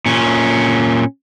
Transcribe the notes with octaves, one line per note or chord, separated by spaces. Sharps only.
A#2 C#4